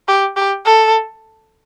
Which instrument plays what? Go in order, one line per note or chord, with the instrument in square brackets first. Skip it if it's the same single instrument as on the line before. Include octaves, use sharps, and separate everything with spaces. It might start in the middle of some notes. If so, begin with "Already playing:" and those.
[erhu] G4
G4
A4